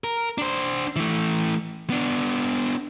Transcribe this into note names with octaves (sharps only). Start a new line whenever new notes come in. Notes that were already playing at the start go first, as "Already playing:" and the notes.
A#4
D4 C5
E3 A3
B3 D4